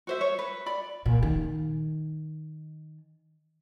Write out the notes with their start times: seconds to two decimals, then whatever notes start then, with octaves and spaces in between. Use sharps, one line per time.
0.07 F#4 C5 E5
0.21 C#5
0.39 B4
0.66 D5 B5
1.06 A#2
1.23 D#3